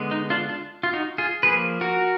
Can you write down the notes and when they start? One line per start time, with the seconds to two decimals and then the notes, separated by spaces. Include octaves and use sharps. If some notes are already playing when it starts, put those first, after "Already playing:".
Already playing: D3 G#3 B3
0.11 D#4
0.30 D4 F4
0.49 D4 F4
0.83 F4
0.93 D#4 F#4
1.18 F4 G#4
1.43 F3 A#3 G#4 B4
1.81 F#4 A#4